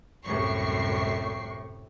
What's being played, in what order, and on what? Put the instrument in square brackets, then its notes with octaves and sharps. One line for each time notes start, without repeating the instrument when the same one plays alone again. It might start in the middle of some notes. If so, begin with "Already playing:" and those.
[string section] C2 C#6 C7 [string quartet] F#2 A2 C3